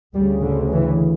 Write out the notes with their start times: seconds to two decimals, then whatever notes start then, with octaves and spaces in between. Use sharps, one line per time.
0.15 D2 C#3 G3
0.43 D3
0.72 E3